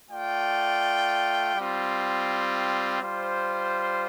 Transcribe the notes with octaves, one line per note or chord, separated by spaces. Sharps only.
A3 F4 D5 G5
G3 C4 F4
G3 F4 C5